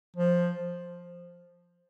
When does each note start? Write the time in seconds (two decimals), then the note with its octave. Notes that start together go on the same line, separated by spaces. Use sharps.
0.16 F3